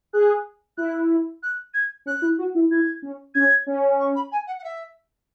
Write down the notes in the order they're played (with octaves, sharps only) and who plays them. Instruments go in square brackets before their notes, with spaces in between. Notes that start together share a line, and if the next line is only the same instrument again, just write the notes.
[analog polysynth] G#4 [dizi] F#6
[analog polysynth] E4 [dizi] F#6
[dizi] F#6
G#6
[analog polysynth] C#4 [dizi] F#6
[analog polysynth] E4
F#4
E4
[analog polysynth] E4 [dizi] G#6
[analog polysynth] C#4
[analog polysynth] C#4 [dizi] G#6
[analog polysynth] C#4
[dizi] C#6
B5
G#5
F#5
F#5
E5